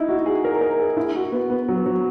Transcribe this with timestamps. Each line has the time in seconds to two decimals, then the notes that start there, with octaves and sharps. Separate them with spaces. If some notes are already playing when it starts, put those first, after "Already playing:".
Already playing: D#4 E4
0.09 F#4
0.26 G#4
0.44 A#4
0.61 A#4
0.79 G#4
0.97 E4
1.15 F#4
1.32 B3
1.50 B3
1.68 F#3
1.86 F#3